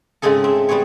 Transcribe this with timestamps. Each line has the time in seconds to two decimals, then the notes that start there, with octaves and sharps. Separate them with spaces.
0.22 G#2 C#3 G#3 C4 G#4 A4
0.44 C4 E5
0.69 G3 B3 C4 G#4 C#5